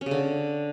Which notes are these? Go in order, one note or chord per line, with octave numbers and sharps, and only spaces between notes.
C#4
C#3
D3